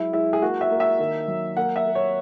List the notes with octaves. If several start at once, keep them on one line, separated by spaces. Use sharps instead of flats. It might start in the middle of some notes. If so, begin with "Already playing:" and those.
Already playing: F#3 G#3 E4
G#3 E4
G#4
A#3 F#4
E5
A#3
E5
D#3
F#3
A#3 F#5
E5
A#3
C#5